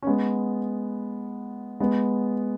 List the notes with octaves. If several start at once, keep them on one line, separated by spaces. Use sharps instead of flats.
C#4
G#3 B3
G#3 B3